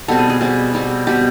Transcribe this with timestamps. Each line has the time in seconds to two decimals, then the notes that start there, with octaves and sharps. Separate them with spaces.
0.08 B2 G3 C4 A4
0.19 G#4
0.29 G#4
0.41 B2 G3 C4
0.74 B2 G3 C4
1.07 B2 G3 C4 G4